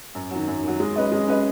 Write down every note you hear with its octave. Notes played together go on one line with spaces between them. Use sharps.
F#2
D#3 F#3
F#2
D#3 F#3
G#3
C#4 B4 D#5
G#3
C#4 B4 D#5